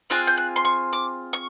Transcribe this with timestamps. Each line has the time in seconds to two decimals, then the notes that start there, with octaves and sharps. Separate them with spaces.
0.10 C4 F4 G#4 F#6
0.27 G6
0.38 F#6
0.56 C6
0.65 C#6
0.93 D6
1.33 C#6